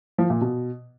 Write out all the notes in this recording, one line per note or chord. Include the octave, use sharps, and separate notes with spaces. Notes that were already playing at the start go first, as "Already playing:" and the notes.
F3
A#2
B2